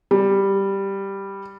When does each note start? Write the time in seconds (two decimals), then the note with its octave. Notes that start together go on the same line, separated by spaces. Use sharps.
0.11 G3